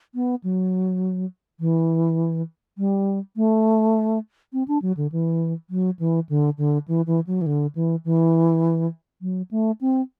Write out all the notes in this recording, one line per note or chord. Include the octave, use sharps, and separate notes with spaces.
B3
F#3
E3
G3
A3
C4
D4
F#3
D3
E3
F#3
E3
D3
D3
E3
E3
F#3
E3
D3
E3
E3
F#3
A3
C4